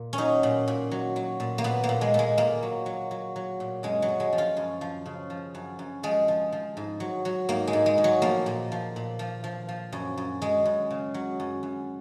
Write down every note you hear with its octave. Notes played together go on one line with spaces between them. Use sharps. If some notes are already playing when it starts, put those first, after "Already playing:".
Already playing: A#2
C#4
F#3 D#4
A#2
A#2
F#3
F#3
A#2
A#3
A#2 B3
A#3
A#2
G#3
A#2 G#3
A#2 A#3
F#3
F#3
F#3
F#3
A#2
F#2 G#3
F#3
F#2
G#3
F3
F4
F#2
F3
C#3
F3
F#2
F#2
F3 G#3
F3
F3
G#2
F#3
F#3
G#2 A#3
G#3
G#2
G#3
G#2
F#3
F3 A#3
A#2
F3
A#2
F3
F3
F3
F#2
F#2
F#2 G#3
F#2
C#3
F#3
F#2
F#2